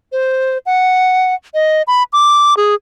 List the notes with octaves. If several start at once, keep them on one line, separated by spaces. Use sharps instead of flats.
C5
F#5
D#5
B5
D6
G#4